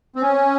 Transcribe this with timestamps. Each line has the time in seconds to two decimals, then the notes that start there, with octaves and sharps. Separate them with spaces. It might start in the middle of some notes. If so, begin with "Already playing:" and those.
0.16 C4
0.22 C#4